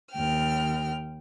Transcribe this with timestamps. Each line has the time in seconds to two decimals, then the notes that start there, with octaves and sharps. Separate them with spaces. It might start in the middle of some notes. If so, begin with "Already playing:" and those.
0.12 D#2 G5 F6